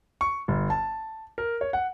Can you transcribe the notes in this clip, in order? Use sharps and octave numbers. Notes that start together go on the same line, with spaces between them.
C#6
G1
A5
A#4
C#5
F#5